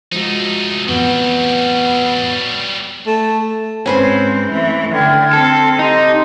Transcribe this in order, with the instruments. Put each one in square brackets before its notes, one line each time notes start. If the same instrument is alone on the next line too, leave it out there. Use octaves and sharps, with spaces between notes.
[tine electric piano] F3 G#3 F#4 [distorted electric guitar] A3 D#4
[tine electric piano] F2 A2 E3 [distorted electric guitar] F#3 G3 [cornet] B3
[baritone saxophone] A3
[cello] G#2 C4 [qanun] C#4 B4 C5
[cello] E3 A3
[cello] D3 [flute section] G5 F6 G#6
[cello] C4 [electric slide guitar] A4
[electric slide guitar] D#4 [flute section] G4 A#5 C6